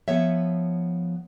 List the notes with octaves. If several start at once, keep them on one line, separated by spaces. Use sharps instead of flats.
F3 B3 C#5 E5